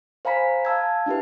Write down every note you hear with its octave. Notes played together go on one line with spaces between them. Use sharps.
C5 F5 G#5 A#5 B5 B6
F5 A5 E6 G#6
D4 E4 G4 B4